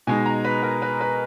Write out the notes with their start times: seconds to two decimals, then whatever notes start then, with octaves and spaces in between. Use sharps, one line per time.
0.07 B2 G#3 D#4 G#5
0.26 A#5
0.45 B4
0.63 A#4
0.82 B4
1.01 B4